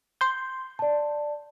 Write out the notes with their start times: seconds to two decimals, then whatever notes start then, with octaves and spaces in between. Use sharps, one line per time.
0.21 C6 G6
0.79 D5 A5